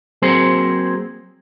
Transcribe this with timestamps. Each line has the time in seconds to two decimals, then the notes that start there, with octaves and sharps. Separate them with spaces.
0.22 F#3 A#3 C4 G#4 C5